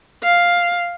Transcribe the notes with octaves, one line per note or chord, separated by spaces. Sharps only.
F5